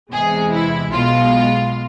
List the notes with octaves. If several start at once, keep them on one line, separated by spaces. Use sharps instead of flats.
E2 C3 G#3 G#4
E4
B1 B2 G#3 F4